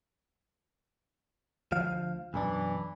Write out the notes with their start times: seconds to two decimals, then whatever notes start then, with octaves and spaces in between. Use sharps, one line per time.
1.72 D2 F3 F5
2.34 B1 F#2 E3 D4